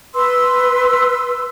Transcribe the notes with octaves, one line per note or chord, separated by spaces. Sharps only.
B4 C6 E6